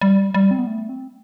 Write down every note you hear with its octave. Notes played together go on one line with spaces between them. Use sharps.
G3
G3
C4
B3
A3
C4